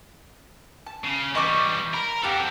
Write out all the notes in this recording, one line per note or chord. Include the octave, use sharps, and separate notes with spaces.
A5
C#3
E3 G3 D#5 C#6 D6
A#4 B5
C4 G4 A4 F5 F#5